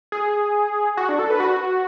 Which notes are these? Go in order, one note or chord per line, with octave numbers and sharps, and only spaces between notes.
G#4
F#4
D4
A4
B4
F#4